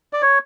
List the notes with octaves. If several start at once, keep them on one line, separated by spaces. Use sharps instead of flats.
D5
C#5